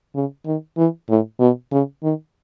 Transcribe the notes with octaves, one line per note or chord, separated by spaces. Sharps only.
C#3
D#3
E3
A2
B2
C#3
D#3